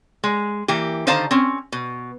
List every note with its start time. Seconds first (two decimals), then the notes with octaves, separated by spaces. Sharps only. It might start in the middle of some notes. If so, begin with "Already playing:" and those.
0.24 G#3
0.68 E3 A#3 G4
1.07 D3 D#3 C5 F5 A5 A#5
1.31 C4 C#4
1.72 B2